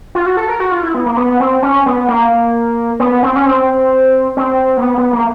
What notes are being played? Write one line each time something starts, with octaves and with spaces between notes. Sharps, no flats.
F4
F#4
A4
A#4
F#4
F4
E4
B3
A#3
B3
C4
C#4
B3
A#3
B3
C4
C#4
C4
C4
A#3
B3
B3
A#3